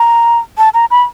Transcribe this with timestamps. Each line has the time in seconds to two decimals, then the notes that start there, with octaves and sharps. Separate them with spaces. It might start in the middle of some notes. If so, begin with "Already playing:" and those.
Already playing: A#5
0.58 A5
0.74 A#5
0.91 B5